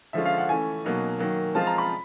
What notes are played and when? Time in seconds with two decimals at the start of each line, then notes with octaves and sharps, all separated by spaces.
0.13 D3 F3 G#3 C#4 F4 E5
0.25 F5
0.38 F#5
0.49 E3 A3 C#4 G#5
0.85 B2 F#3 A#3 D#4
1.19 D#3 F#3 A#3
1.55 F3 G#3 C4 F4 A5
1.67 A#5
1.78 B5